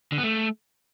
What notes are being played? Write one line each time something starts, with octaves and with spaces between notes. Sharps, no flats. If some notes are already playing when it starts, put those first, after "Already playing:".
D3
B3
A3